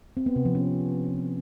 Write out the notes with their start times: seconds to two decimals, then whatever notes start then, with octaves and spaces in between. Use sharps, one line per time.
0.17 C4
0.26 B3
0.36 C3
0.45 F3
0.55 C#4